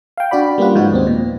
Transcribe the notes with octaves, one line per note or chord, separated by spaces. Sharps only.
F5 G5
D4 F#4 D5 B5
G3 A#3 B3 C#4 F4 F#5
G#2 F3 D#4 F#4
D#2 B3 C4
A#2